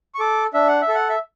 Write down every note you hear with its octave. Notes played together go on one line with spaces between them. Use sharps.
C#6
A4 D6
D4 E5
F#5
E5
A4
F#5
E5